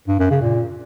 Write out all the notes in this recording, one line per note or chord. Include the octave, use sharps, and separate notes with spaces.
G2
F#2
C#3
A#2